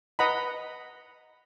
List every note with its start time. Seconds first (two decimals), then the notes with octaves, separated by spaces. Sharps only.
0.19 B4 D#5 F#5 A#5 B5